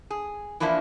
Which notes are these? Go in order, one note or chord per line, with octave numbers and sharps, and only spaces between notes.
G#4
E3 F3 A#3 D4 E4